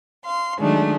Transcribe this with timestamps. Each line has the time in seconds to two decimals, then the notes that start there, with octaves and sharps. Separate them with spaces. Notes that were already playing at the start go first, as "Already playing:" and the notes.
0.23 F5 C6
0.58 D#3 F#3 G#3 A3 D4